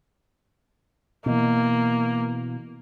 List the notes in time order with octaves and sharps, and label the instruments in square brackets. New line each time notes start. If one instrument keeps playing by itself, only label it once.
[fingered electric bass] B2 E3 [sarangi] A#3